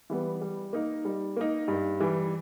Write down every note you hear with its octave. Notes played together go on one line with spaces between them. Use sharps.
E3 G3 B3
G3
A#3 D#4
G3
A#3 D#4
G2
E3 G3